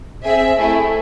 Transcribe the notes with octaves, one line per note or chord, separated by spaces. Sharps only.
C4 G#4 E5
A3 E4 G#4